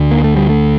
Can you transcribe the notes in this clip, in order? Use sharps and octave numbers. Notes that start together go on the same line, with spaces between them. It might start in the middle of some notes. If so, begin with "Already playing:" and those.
Already playing: D2 D3
A#3
A3
G3
A3